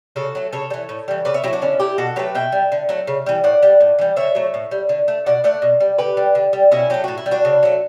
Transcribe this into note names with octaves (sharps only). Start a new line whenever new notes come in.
C#3 F#4 A4
F#3 A3
C#3 A4 C#5
G3
E3
A2
E3 G3
C#3 B4 D5
C#5 E5
F#3 A3 E4 G4
D4 F#4
D3 C#4 E4
A3 E4 G4
B2 F#4 A4
F#3 A3 G4 B4
B2 E5 G5
G3
D3
F#3 A3
C#3
E3 G3
A2 D5 F#5
G3
A2
E3 G3
D3 C#5 E5
F#3 A3
A2
G3
D3
A3
B2 D5 F#5
A3 D5 F#5
B2
G3
D3 G4 B4
G3
D3
G3
B2 C#4 E4
F#3 A3 G4
A2 F#4
E4
G3
D4 F#4
C#3
F#3 A3